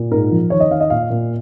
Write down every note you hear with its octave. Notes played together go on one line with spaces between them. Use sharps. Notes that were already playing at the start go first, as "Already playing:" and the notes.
Already playing: A#2
G#2 A#4
F3
D#3 C#5
D#5
D#3 F5
D#5
A#2 F5
A#2